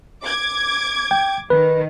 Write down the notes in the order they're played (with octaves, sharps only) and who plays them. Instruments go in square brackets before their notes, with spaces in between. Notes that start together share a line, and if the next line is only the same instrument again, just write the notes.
[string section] D6 G#6
[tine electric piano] G5
[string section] D#3 [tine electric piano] B4